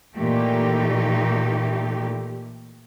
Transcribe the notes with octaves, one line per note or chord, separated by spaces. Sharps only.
A#2 E3 A3 D#4 G4